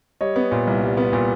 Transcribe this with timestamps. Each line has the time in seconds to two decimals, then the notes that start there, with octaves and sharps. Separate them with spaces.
0.21 G3 C#5 D#5
0.36 B3
0.51 A#2
0.67 C2
0.82 G3
0.97 B3
1.13 A#2